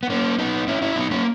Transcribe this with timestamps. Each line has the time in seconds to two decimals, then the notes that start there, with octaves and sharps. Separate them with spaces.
0.03 B3
0.10 A#3 C#4
0.39 B3 D#4
0.68 C#4 E4
0.82 C#4 E4
0.96 B3 D#4
1.11 A#3 C#4